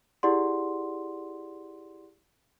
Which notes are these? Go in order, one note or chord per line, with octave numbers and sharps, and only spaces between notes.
E4 G4 G#4 D5 F#5 C6